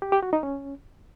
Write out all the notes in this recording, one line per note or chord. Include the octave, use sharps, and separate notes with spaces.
G4
G4
F#4
D#4
C#4